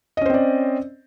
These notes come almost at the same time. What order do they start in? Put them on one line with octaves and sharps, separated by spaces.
D#5 C#4 C5 C4 D5